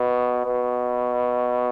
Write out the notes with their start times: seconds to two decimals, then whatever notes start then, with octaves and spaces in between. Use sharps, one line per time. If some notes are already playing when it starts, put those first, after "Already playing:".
Already playing: B2
0.46 B2